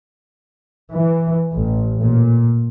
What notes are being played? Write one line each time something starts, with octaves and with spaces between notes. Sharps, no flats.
E3
A1
A#2